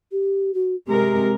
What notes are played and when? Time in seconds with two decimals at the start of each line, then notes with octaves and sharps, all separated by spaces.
0.12 G4
0.54 F#4
0.87 C3 G#3 G4 A#4